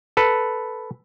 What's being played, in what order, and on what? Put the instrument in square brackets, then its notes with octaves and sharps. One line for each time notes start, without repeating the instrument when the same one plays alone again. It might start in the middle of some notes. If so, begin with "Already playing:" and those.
[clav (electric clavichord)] A4 B4